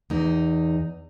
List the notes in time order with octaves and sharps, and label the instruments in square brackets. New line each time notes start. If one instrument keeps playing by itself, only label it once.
[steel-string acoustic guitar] E2 D#4